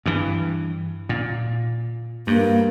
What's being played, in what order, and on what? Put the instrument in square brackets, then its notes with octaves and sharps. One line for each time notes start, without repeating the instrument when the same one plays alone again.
[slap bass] G2 E3
A#2
[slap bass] G2 [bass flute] A#3